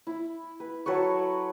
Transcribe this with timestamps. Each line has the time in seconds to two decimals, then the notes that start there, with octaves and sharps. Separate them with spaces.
0.07 E4
0.60 B4
0.86 F#3 A4 B4 C#5